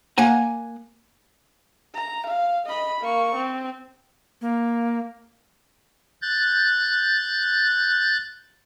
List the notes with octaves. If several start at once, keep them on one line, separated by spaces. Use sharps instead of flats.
A#3 F#5 G#5 A#5
A#5
F5
D#5 B5
A#3 C#6
C4
A#3
F#6 G6 A6